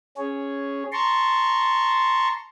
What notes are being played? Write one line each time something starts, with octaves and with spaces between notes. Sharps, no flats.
C#4 G#4 C#5
A5 A#5 C6 C#6